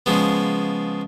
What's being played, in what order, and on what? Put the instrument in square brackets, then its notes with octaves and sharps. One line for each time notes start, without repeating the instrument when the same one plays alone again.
[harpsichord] C#3 F3 G#3 B3